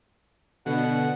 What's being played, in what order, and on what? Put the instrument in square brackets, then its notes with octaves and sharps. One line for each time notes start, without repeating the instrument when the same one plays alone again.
[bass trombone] B2 [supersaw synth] D3 [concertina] F#5